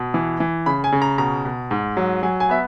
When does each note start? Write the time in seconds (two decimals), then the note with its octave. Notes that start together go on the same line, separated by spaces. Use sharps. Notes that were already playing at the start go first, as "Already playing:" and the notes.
Already playing: B2
0.14 E3
0.40 E3
0.66 C#3 B5
0.84 G#5
0.92 C#3
1.02 A#5
1.18 B2 A#5
1.45 B2
1.71 G#2
1.97 F#3
2.23 F#3 G#5
2.40 G#5
2.49 B3 E5